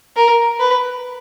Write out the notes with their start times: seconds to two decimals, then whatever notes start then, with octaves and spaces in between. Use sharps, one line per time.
0.16 A#4
0.60 B4